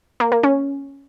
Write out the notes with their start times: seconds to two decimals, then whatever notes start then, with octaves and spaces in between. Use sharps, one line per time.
0.20 A#3
0.32 A#3
0.43 C#4